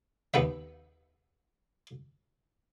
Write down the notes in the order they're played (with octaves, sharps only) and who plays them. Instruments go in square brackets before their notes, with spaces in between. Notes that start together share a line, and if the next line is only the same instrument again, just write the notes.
[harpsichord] D#2 B3 B4 E5